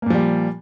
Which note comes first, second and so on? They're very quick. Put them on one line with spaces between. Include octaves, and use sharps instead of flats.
A#3 A#2 F3 G3